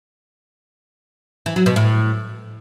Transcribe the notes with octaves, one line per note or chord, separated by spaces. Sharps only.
E3
F#3
B2
A2